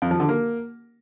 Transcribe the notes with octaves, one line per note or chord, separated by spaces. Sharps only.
F2
F3
D3
A#3